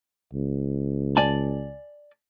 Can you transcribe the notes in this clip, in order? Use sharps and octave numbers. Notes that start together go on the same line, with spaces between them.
C#2
D5 G#5 A5